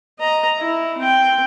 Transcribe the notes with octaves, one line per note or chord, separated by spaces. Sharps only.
D#5 A#5
E4
C4 G5